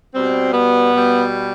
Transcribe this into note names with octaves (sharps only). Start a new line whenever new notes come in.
B2 G3 C4
B3
B2 G3